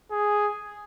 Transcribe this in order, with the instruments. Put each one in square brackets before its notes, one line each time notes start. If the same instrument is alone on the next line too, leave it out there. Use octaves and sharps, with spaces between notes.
[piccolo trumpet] G#4